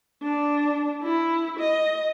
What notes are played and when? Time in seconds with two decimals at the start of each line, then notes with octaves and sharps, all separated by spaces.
0.23 D4
1.02 E4
1.59 D#5